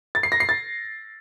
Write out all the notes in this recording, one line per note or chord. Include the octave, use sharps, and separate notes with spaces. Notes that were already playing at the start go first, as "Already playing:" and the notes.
A6
C7
A#6
C7
A6